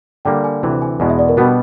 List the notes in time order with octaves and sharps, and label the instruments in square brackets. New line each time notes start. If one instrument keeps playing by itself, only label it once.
[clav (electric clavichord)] D3 G3 A#3 [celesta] G5
[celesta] G#5
[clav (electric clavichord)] D2 C3 E3
[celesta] G#5
[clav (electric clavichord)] E2 B2 G#3 B3
[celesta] E5
D5
A#4
[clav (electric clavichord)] B2 G3 B3 D4 [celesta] F#4